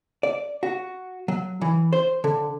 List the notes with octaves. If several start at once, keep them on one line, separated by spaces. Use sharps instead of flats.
D5
F#4
F#3
E3
C5
D3